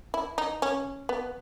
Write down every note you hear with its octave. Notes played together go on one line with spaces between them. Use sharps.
E4
D#4
C#4
B3